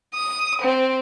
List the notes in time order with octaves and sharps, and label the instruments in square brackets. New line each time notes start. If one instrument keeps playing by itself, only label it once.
[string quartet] D#6
C4